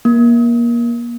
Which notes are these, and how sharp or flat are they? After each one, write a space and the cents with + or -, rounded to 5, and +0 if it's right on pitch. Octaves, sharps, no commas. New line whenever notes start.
A#3 +25